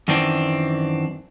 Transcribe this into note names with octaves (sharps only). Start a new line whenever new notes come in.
F#2 D#3 E3 C4 D4